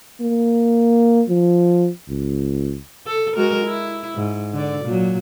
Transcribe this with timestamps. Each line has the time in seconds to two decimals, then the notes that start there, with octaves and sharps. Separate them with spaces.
0.21 A#3
1.29 F3
2.09 C#2
3.07 A4
3.36 G#3 F#4 A#4
3.66 E4
4.15 G#2
4.53 D3 D5
4.85 A#2 F#3